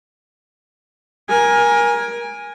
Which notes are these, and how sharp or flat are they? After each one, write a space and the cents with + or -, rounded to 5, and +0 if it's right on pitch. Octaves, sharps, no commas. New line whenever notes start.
A#4 +25 G#5 -10